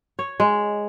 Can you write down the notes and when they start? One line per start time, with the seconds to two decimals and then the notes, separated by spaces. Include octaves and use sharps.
0.19 C#5
0.40 G#3